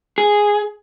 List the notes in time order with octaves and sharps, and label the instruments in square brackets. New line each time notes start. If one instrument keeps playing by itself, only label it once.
[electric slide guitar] G#4